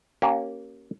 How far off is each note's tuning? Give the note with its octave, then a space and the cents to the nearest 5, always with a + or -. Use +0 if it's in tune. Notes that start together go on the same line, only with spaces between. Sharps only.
A#3 +0 C#4 +0 G4 -35